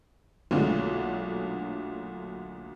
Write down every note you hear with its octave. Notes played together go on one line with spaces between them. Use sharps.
B1 A#2 D3 G#3 A3